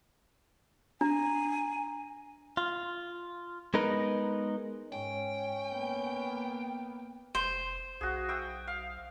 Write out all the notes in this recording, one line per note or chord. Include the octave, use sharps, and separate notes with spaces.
D4 G#5 A#5
F4
G#3 B3 D#4 A#4 B4
G#2 C#4 G5
A#3 B3
F1 C5
B1 F#4 G#4
E5 G5 D#6
F5